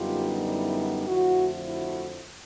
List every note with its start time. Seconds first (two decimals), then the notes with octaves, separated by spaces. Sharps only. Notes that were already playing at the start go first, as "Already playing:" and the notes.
Already playing: F#2 D3 G3 B3 D#4 F4 G4
0.49 E4
1.07 F2 D3 F3 A3 E4 F#4
1.66 E4 F#4